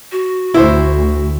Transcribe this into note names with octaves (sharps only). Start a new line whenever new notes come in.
F#4
D2 E4 C5